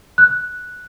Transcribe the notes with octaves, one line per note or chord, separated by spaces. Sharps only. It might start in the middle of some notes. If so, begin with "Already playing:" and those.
F#6